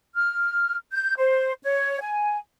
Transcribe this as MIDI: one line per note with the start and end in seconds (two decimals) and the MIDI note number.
0.16 0.75 89
0.93 1.13 91
1.18 1.53 72
1.63 1.98 73
2.01 2.37 80